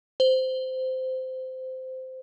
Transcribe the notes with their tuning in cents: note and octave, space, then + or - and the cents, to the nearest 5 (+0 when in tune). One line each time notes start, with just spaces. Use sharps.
C5 -15